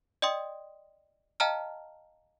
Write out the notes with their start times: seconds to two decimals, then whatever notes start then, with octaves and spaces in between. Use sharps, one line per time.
0.22 D5 D#5 G5 C6 D#6
1.40 D#5 F5 G5 A5 A#5 F6